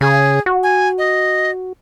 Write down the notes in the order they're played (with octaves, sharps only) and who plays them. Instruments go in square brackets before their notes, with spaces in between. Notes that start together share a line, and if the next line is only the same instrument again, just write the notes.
[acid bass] C#3 [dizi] G#4
[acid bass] F#4
[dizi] G#5
D#5